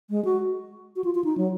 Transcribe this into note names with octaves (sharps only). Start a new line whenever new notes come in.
G#3
F#4
F#4
F4
F4
D#4
F#3